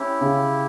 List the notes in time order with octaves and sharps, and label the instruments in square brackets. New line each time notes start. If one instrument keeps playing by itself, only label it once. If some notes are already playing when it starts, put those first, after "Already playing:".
Already playing: [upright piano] C#4 [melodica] E4 G4
[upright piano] C#3